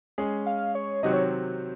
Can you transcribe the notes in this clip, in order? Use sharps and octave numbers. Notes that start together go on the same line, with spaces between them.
G#3 C#4 G#4
F5
C#5
C3 D#3 F#3 C4 F#4 D#5
C#5